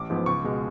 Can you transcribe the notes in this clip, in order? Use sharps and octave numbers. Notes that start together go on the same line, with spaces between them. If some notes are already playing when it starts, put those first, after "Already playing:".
Already playing: A1 D6
G#2 F3 B3
C#2 C#6
B2 G#3